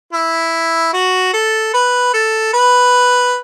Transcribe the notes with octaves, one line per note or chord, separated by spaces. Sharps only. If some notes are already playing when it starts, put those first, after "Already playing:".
E4
F#4
A4
B4
A4
B4